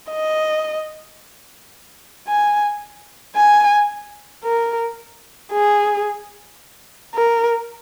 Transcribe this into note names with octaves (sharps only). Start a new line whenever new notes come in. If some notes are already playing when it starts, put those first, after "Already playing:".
D#5
G#5
G#5
A#4
G#4
A#4